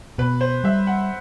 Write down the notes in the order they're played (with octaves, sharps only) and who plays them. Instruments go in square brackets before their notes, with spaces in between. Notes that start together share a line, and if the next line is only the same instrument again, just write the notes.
[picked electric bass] B2 [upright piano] B4
[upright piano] C5
[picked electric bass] G3 [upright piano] E5
[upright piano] F#5